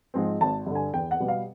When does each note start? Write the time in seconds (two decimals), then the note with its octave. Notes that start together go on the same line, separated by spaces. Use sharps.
0.14 G#2 F3 G#3 C4
0.41 G#1 A5
0.66 G2 D3
0.75 G#5
0.93 E2 G5
1.11 F#5
1.20 B2 G3 B3
1.28 F5